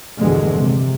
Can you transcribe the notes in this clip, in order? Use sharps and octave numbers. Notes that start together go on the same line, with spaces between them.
A#1 E2 G2 B2 D3 G#3
C3